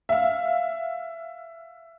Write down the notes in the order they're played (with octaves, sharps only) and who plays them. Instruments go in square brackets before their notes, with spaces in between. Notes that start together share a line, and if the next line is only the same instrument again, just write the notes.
[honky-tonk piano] E5 F5